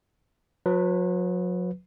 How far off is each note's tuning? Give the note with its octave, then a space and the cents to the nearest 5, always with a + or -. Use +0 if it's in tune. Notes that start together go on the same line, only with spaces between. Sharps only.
F#3 -40 B4 +0